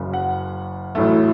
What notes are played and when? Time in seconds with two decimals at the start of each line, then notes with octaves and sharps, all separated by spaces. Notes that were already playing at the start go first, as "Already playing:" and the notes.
Already playing: F#1 F#2 C#3
0.13 F#5
0.95 A1 A2 F#3 A3